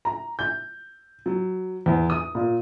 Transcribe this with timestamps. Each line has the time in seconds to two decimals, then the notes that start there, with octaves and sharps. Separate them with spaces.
0.05 A#5
0.39 G6
1.26 F#3
1.86 E2
2.10 D#6
2.35 A#2